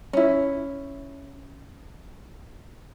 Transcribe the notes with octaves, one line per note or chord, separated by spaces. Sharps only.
C#4 E4